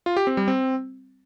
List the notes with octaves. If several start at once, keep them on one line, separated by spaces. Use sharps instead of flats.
F4
G4
C4
G3
C4